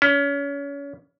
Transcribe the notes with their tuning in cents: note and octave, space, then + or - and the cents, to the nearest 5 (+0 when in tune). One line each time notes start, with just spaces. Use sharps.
C#4 +30